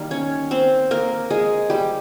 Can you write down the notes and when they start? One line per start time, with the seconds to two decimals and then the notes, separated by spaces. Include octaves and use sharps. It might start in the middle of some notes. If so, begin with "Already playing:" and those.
Already playing: D#3 G3 A#3
0.11 C#4 C#5
0.51 C4 C5
0.91 A#3 A#4
1.30 G#3 G#4
1.70 G3 G4